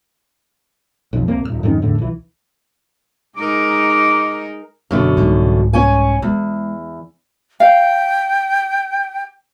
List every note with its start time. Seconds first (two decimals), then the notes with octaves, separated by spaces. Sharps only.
1.13 B1 F2
1.28 C2 A#3 C4
1.44 D#1 E2
1.63 F2 G#2 D#3 C#4
1.82 E2 A2 D3
1.98 B1 E3
3.37 G#3 D#4 A#4 D6
4.91 F#1 F#2 B2 D3
5.17 C2 G#2
5.73 C#4 C#5 G#5
6.22 E2 G#3
7.60 F5 G5